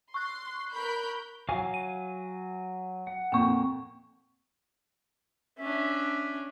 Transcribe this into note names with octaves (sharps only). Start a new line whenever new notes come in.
C6 C#6 F#6
A#4 B5 G6
F#3 F5 G#5
D#7
F#5
F2 A#2 G5 C#6
C#4 D4 E5